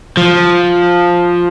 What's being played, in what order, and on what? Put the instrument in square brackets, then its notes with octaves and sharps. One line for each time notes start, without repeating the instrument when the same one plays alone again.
[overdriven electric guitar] F3